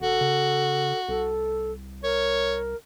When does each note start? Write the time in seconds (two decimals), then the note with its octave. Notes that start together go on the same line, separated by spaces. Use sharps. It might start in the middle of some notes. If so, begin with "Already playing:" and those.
0.01 E1 F#4 A4
0.21 C#3
1.09 C2 A4
2.04 A#4 C#5